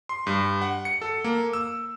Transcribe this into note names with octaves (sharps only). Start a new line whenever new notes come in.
C6
G2
F#5
C#7
A4
A#3
E6